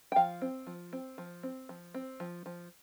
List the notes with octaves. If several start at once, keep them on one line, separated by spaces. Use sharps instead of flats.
G5
F3 F5
C4
F3
C4
F3
C4
F3
C4
F3
F3